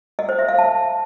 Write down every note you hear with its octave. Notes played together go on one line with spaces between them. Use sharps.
D#5
C5
E5
F5
A5